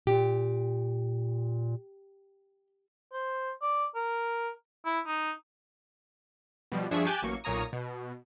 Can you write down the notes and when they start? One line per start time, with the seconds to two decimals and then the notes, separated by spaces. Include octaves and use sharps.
0.07 A#2 G4
3.13 C5
3.62 D5
3.95 A#4
4.85 E4
5.07 D#4
6.72 B2 F3 G3
6.91 G2 F3 D4 G#4 E5 C#6
7.07 G4 G#5 A5 D6 F#6 G6
7.22 A1 F#3 A#3 C#6
7.44 B1 A#2 A#3 C#5 A#5 D#6
7.73 B2